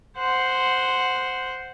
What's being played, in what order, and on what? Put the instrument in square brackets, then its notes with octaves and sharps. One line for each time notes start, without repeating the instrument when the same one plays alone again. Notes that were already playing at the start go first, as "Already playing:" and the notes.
[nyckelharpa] C5 F#5